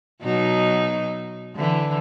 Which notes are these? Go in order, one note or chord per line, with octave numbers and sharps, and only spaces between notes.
B2 F#3 D#4
D3 E3